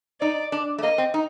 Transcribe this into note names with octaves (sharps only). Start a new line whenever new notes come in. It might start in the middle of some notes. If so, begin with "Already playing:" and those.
D#4 D5
D4
A3
A#3 D#5
C4
D#4